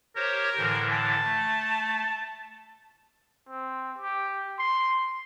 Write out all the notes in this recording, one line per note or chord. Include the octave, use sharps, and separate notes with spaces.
G4 A#4 C5 C#5
A2 D3 E3
A5
A3
C4
G4
C6